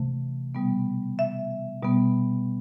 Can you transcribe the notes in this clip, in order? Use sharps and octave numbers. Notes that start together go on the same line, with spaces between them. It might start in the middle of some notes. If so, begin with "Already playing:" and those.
Already playing: C3 E3 A3
B2 G3 B3
E5
B2 G3 B3